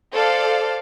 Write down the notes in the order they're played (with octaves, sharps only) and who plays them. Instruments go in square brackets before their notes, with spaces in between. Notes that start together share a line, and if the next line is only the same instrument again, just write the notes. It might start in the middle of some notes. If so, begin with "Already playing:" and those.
[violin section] A4 C5 D5 F5